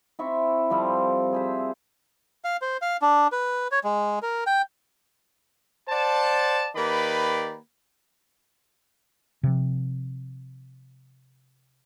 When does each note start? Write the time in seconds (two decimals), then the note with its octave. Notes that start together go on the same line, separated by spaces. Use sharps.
0.19 C4 E4 E5 C#6
0.70 F3 G3 C4 A4
1.33 G#4 C5 E5
2.44 F5
2.62 C5
2.82 F5
3.02 D4
3.32 B4
3.72 C#5
3.84 G#3
4.22 A#4
4.47 G5
5.89 C5 D5 F#5 A5
6.75 D#3 A#3 G4 B4 D5 B5
9.43 C3 F3